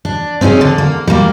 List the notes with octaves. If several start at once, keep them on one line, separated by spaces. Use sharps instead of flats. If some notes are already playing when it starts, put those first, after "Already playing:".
D4
C4 C#4 D#4 F#4 G#4
D3
A#3
G3 A#3